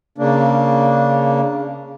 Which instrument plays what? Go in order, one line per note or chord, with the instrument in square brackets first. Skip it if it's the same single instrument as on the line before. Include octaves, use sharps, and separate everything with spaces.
[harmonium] C#3 A#3 D4